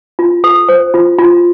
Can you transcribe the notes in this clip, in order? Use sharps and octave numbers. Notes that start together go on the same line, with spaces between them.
F4
A4
C5
F4
F4